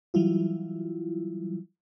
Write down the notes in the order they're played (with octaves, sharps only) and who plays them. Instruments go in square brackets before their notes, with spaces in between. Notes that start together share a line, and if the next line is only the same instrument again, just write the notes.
[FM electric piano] E3 F#3 G3 E4 F4